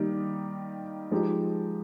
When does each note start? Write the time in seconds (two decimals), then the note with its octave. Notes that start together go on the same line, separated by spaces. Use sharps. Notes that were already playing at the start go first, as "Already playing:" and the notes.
Already playing: D#3 G3 A#3 D#4 G4
1.11 F3 G#3 D#4 G4